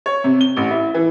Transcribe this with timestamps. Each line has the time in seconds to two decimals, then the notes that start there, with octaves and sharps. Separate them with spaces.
0.06 C#5
0.24 C3
0.41 G7
0.57 A1
0.71 E4
0.94 E3